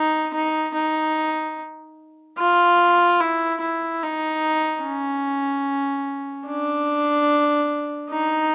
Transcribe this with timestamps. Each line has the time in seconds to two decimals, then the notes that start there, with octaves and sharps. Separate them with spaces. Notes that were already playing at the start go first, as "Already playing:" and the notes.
Already playing: D#4
0.34 D#4
0.74 D#4
2.38 F4
3.20 E4
3.61 E4
4.03 D#4
4.83 C#4
6.47 D4
8.10 D#4